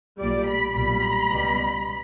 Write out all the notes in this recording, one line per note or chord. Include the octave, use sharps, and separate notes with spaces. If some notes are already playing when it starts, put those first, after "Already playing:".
B1 A#2 G3 D5
B5
B1 A#2 G3 B5
C#2 B2 G3